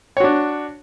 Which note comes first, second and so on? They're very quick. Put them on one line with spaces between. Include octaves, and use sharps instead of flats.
C#5 F#4 D4